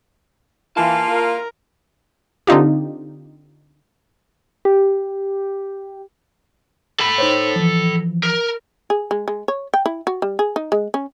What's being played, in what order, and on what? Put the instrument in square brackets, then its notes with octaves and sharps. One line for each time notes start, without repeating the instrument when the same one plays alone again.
[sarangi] E3 [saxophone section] A#3 F4 [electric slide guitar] A5
[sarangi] A#4
[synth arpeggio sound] D3 C4 D#4 F4 G4
[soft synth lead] G4
[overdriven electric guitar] A4 B5
[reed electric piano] D#4 C5 C#5
E3 F3
[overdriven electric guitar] A#4
[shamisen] G#4
G#3
G#3
C#5
G5
E4
F#4
G3
G#4
D#4
G#3
C#4